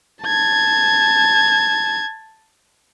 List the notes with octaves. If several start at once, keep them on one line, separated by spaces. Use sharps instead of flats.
A5 G#6